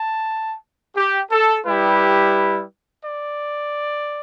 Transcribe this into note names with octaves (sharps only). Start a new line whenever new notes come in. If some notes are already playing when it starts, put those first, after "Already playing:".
Already playing: A5
G4
A4
G3 E4 G4 B4
D5